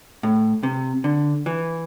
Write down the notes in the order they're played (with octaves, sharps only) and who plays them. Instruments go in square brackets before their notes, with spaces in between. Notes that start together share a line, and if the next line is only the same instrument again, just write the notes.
[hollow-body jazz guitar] A2
C3
D3
E3